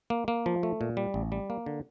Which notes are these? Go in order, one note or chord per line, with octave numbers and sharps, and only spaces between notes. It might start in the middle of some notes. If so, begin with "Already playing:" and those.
A#3
A#3
F3
A3
A#2
G3
A1
G3
A#3
D3